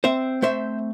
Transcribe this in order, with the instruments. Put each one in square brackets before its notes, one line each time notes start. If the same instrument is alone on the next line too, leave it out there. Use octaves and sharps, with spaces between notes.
[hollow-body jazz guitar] C4 C5 E5
A3 C5 E5